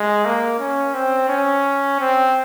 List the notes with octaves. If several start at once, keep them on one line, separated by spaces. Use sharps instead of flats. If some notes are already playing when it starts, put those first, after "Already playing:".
Already playing: G#3
A#3
C#4
C4
C#4
C4